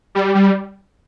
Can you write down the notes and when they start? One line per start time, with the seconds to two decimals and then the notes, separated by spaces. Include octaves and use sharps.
0.15 G3
0.35 G3